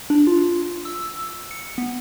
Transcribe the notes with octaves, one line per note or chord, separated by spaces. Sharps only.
D4
F4
E6
C#7
B3